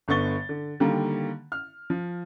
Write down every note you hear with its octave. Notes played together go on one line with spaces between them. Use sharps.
G1 D3 B3 C#6 A6 G7
D3
D3 D#3 G3 A#3
F6
F3